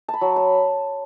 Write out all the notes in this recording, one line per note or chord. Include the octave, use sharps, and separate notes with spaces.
A5
B5
F#3
B5